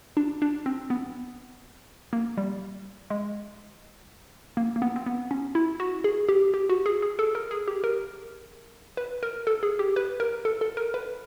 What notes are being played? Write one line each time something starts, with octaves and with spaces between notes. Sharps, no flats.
D4
D4
C4
B3
A#3
G3
G#3
A#3
A#3
B3
C4
B3
C#4
E4
F#4
G#4
G4
G4
F#4
G#4
G#4
A4
A#4
G#4
G4
A#4
B4
A#4
A4
G#4
G4
B4
A#4
A4
A4
A#4
B4